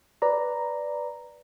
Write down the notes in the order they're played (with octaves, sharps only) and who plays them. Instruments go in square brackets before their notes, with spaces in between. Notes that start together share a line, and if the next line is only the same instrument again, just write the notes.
[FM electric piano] B4 D5 A#5